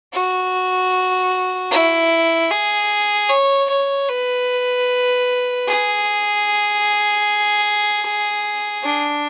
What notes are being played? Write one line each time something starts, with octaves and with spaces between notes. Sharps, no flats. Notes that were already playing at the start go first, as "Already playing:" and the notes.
F#4
E4
G#4
C#5
C#5
B4
G#4
D4